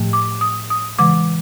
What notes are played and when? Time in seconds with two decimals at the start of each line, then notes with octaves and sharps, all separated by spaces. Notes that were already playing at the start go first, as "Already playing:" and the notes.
Already playing: A2 F3 A3
0.13 D6
0.41 D#6
0.70 D#6
0.99 C#3 E3 G#3 D6